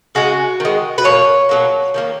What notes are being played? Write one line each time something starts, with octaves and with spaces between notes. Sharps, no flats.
C#3 G#3 F#4
D#3 G#3
B4
B2 A#3 C#5
B2 F#3 A#3
D#3 F#3 A#3